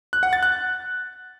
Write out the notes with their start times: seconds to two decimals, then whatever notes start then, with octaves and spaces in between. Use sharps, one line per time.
0.13 F#6
0.23 F#5
0.33 A6
0.43 F#6